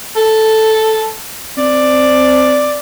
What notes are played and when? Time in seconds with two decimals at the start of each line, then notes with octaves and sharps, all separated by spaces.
0.16 A4
1.58 C4 D5